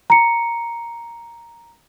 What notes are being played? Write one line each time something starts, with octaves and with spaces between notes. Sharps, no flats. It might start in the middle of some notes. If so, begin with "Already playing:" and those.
A#5 C#7